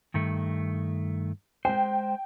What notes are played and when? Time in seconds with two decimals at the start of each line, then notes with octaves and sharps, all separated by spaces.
0.14 G2 D#3 A3
1.65 G#3 C5 G5